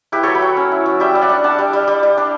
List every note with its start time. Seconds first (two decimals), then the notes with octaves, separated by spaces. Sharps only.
0.12 E4 G4 B4
0.23 F#3 A4 C#5
0.34 G5 B5
0.42 F#3
0.57 C#4
0.72 E4
0.86 F#3
1.00 G3 E5 G5
1.15 G3
1.22 D5 F#5
1.29 D4
1.44 D4 F#5 A5
1.58 G3
1.73 G3
1.88 G3
2.03 G3
2.17 D4